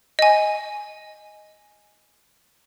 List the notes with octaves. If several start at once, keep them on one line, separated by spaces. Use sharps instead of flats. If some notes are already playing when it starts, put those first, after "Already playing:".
D#5 G#5